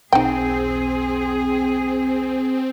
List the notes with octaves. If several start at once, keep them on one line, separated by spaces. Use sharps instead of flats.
B1 E2 C4 D#4 G#4 G5